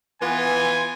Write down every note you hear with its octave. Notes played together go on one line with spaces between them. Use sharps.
E3 B3 F4 G#5